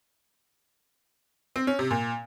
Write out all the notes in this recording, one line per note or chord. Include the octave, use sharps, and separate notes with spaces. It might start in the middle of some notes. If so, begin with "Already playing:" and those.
C4
C#4
C3
A#2